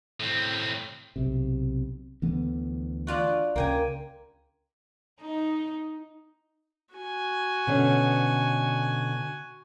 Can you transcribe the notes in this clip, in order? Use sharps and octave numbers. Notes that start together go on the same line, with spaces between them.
A2 C4
B1 C3
D2 E3 B3
D4 F4 F#4
C#2 C#3 A#3 G5 G#5
D#4
F#4 G#5
B2 D3 C#4